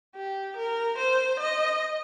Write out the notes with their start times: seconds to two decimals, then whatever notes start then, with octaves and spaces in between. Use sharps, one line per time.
0.16 G4
0.57 A#4
0.98 C5
1.40 D#5